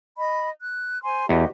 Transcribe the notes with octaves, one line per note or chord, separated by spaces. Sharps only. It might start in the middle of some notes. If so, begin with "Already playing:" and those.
D#5 B5
F#6
C5 G#5 C6
E2 F#4 G4 D#5